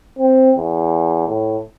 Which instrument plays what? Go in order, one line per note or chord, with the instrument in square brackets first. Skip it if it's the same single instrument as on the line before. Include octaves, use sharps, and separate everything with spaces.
[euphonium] C4
E2
A2